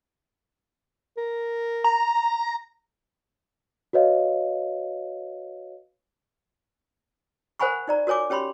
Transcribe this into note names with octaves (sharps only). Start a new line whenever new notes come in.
A#4
A#5
F#4 B4 C#5 D#5 F5
A#4 C5 F#5 G#5 B5 C#6
D#4 D5 A#5
F#4 A#4 C#5 G#5 D6
C#4 G4 C#5 B5 C6